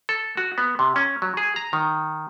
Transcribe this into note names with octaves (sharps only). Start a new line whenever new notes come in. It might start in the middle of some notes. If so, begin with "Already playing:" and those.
A4
F#4
B3
C3
C#4
F#3
G#4
A#5
D#3